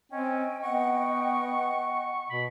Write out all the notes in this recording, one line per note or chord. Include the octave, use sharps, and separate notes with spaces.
C4 C#4 D#5 G5 G#5
B3 F#5 C#6
B2 B5